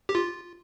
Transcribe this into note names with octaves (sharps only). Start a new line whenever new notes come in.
G4
F4